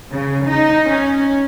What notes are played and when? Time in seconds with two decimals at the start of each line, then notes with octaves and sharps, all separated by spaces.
0.12 C#3
0.46 D#4
0.88 C#4